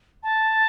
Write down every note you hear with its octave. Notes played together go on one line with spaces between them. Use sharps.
A5